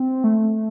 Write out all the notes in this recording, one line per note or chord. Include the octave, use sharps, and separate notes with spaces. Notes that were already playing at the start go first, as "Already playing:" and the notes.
Already playing: C4
A3